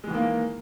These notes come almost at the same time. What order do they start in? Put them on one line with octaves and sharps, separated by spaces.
G#3 E3 D#3 A#3